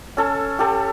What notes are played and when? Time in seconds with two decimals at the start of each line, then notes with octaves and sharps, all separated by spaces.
0.17 C#4 A4 A5
0.59 G4 A4 F#5